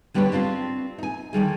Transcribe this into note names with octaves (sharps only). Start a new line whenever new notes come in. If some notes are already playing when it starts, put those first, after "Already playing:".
D3 G3 B3 G4 B4 C#5
C4 D4 F4 G4
D#4 G#5
D3 D#3 G3 G#4